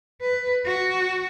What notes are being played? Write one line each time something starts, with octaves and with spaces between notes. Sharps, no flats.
B4
F#4